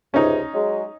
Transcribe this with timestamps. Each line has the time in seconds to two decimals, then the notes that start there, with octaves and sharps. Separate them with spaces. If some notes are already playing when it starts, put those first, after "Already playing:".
0.14 C#2 C3 C#4 D#4
0.54 F#3 G#3